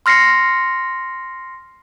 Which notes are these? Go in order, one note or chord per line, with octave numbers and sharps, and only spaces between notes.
C6 F6 A#6 C7 C#7